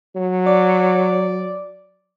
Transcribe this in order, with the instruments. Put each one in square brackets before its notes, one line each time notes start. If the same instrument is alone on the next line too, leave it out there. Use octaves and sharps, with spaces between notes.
[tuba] F#3
[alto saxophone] D5